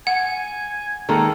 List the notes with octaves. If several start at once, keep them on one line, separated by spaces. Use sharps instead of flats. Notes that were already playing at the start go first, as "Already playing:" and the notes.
F#5 G#5
D#3 G#3 A#3 A4